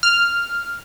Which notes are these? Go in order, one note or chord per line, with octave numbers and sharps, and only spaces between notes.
F6